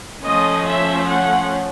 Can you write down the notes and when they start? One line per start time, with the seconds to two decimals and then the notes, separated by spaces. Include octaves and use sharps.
0.23 F3 A3 C#4 D#5
0.66 E5
1.07 F#5